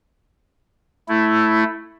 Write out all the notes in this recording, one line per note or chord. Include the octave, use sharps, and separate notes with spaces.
A3 E4